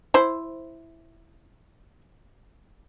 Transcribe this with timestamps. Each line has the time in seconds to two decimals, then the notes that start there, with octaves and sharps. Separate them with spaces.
0.14 E4 C5